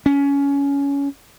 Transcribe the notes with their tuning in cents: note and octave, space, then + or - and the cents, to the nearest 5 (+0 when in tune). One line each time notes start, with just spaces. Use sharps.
C#4 +20